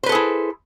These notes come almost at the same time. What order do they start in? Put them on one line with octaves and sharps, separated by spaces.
C5 B4 A4 G#4 E4